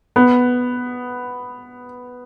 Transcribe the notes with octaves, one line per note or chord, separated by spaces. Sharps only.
B3